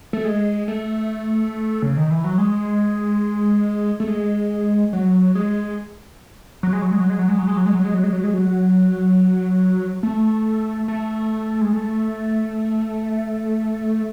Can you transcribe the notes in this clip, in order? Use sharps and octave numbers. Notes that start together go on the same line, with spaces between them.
A3
G#3
A3
C#3
D#3
E3
F#3
G#3
A3
G#3
F#3
G#3
F#3
G#3
F#3
G#3
F#3
G#3
F#3
G#3
F#3
G#3
F#3
G#3
F#3
G#3
F#3
G#3
F#3
G#3
F#3
A3
A3
G#3
A3